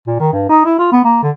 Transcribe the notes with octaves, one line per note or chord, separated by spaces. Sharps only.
A#2
D#3
G2
D#4
E4
F4
B3
A#3
D3